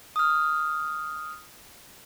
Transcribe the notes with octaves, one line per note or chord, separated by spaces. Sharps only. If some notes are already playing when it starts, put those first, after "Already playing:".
D#6 F6